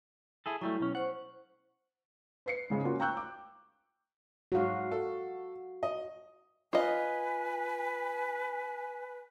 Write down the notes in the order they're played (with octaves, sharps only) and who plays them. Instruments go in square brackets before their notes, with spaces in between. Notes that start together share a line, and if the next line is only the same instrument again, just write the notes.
[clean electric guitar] E4 G#4 A4
[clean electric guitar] F#3 G3 A3 [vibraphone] E4
[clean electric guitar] B1 C#4
[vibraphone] C5 C#6 [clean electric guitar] F#5
[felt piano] B4 C7 C#7
G#2 C#3 G#3
A#3 C#4 F4 F#4
G5 A#5 C#6 E6 F#6 G6
D6
[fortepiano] G#2 F#3 [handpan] F#4 F5
[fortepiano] A4
D#5
[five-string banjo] F4 D#5 [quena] B4 [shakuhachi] G#5